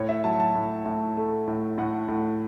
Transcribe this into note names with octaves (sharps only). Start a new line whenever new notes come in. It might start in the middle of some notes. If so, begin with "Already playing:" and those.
Already playing: A2 C#5
E5
F#3 A5
A5
A2
A2
A3
A2
A2 F#5
A2